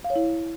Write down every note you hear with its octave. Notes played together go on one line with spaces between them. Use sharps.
F5
C#5
E4